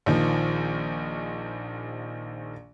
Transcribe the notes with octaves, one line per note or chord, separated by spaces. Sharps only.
A#1 D#3 F3